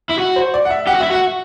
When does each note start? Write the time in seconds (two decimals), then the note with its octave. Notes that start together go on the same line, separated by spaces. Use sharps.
0.11 E4
0.19 F#4
0.36 C5
0.54 D5
0.65 F#5
0.70 E5
0.87 G4 F#5
0.95 F#4
1.00 E4 E5
1.11 F#4 F#5